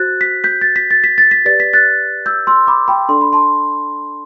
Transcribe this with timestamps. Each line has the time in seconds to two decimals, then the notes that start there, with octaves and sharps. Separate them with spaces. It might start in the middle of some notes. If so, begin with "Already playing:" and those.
Already playing: F#4 C5 F#6 A6
0.21 B6
0.44 G6 B6
0.61 A6
0.76 B6
0.91 A6
1.04 B6
1.18 A6
1.31 B6
1.45 G4 B4 D5 A6
1.60 B6
1.73 F#6 A6
2.26 E6 G6
2.47 C6 E6
2.67 B5 D6
2.88 G5 B5
3.09 D4 A4 D5 C6
3.21 B5
3.33 A5 C6